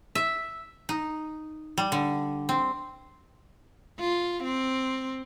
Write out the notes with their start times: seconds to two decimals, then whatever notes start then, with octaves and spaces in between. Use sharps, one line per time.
0.15 E5
0.89 D#4
1.78 G3
1.92 D3
2.49 C4
4.00 F4
4.44 C4